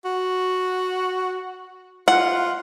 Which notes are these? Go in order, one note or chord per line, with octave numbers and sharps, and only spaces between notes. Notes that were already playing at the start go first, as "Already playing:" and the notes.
F#4
F4 F#5